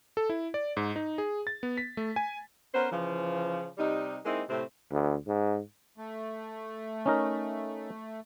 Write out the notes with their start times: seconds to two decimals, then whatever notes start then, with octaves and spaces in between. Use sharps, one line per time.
0.17 A4
0.30 E4
0.54 D5
0.77 G#2
0.96 D#4
1.18 G#4
1.47 A6
1.63 B3
1.78 B6
1.97 A3
2.16 G#5
2.74 B3 C#4 A#4 C5
2.91 C#3 E3 F3
3.78 C3 G3 D#4
4.24 G#3 A#3 C4 D#4 E4
4.48 A2 C3 A3 C4
4.91 D2
5.27 G#2
5.98 A3
7.06 C#4 D#4 A#4